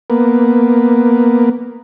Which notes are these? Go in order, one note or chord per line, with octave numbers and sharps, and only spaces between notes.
A#3 B3